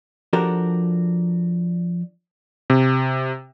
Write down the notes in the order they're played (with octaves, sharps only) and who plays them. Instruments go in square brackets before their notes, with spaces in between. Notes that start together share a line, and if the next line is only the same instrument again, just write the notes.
[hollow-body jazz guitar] F3 D4 F#4 G4 A4 A#4
[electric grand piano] C3